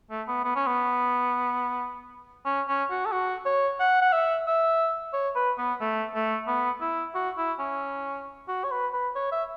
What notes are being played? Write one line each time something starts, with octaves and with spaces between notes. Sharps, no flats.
A3
B3
B3
C#4
B3
C#4
C#4
F#4
A4
F#4
C#5
F#5
F#5
E5
E5
C#5
B4
B3
A3
A3
B3
E4
F#4
E4
C#4
F#4
C#5
B4
B4
C#5
E5